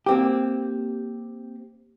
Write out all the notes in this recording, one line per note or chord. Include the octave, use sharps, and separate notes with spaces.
A#3 C4 G4